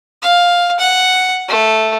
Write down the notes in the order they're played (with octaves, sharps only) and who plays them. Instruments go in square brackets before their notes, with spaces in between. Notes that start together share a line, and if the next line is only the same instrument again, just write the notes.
[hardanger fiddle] F5
F#5
A3